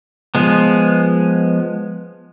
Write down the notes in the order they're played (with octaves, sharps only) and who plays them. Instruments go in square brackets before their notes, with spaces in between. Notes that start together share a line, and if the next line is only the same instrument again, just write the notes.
[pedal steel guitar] F3 G#3 B3